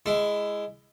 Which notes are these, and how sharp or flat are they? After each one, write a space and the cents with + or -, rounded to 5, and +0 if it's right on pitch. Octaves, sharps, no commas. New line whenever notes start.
G#3 +0 E4 +15